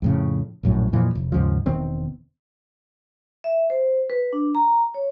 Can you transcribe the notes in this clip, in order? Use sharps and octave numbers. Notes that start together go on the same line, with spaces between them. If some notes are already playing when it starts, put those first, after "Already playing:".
F2 A2 C#3
A#1 F#2 A2
F2 A#2 E3 F3
F1
D#2 G#2 C#3 F3
E1 D#3 B3 C4
E5
C5
B4
D4
A#5
C#5